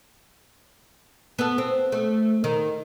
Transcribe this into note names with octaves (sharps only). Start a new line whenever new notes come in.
B3 A4
C4
A3
D#3